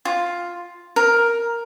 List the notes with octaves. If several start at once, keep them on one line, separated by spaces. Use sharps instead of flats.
F4
A#4